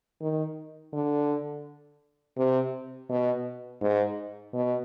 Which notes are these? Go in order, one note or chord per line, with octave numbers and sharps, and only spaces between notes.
D#3
D3
C3
B2
G#2
B2